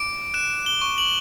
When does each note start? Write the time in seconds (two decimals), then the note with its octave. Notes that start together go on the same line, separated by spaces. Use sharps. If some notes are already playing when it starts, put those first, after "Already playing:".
Already playing: D6 D7
0.34 F#6 E7
0.66 G7
0.81 C#6
0.98 F#7